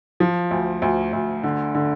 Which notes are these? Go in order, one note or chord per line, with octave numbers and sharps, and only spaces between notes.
F3
D2
D2
D2
D3
D3